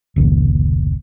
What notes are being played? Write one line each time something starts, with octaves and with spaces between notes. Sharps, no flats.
F1 C#2 A#2 D#3